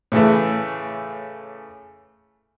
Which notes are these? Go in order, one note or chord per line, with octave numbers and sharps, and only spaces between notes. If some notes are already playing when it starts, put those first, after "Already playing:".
A2 C#3 E3 A3